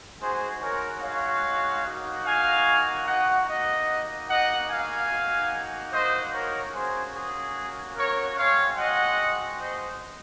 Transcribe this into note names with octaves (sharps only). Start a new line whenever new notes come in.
G#3 D#4 F#4 G#4 C5
A#4 C#5
C#5 F5
A#3 D#4 F#4
F5 G#5
D#5 F#5
A#3 D#4 F#4 D#5 F#5
D#5 F#5
F5 G#5
A#3 D#4 F#4
C5 D#5
A#4 C#5
A#3 C#4 F#4 G#4 C5
G#4
A#4 C#5
G#3 C4 F#4 C#5 F5
D#5 F#5
C5 D#5